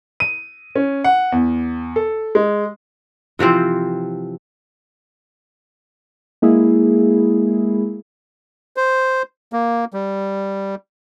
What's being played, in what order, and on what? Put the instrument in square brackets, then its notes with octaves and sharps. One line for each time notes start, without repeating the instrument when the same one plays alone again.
[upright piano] D#7
C#4
F#5
E2
A4
G#3
[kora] C3 E3 F3 C4
[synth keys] G#3 A#3 E4 G#4
[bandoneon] C5
A#3
G3